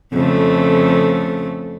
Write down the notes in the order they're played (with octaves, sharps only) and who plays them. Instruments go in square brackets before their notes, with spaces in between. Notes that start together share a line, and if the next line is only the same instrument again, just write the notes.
[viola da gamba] F2 C#3 A3